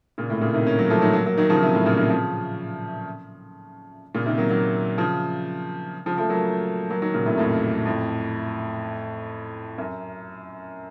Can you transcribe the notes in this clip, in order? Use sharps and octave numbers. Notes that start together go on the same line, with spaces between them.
A#2 C#3
A2 C3
A#2 C#3
C3 D#3
A#3 C#4
F#3 A#3
F3 A3
D#3 F#3
F#3 A#3
F#3 A#3
D#3 F#3
C#3 F3
C3 D#3
A2 C3
A#2 C#3
C3 D#3
C#3 F3
A#2 C#3
C3 D#3
F#3 A#3
F#3 A#3
C#3 F3
C#3 F3
F3 A3
F#3 A#3
F#3 A#3
D#3 F#3
A#2 C#3
A2 C3
F2 A2
F2 A2
F#2